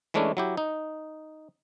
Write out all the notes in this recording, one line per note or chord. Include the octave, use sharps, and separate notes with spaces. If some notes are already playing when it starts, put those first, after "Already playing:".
E3 G#3 A3 C#4 D4 E4
F#3 E4 G4
D#4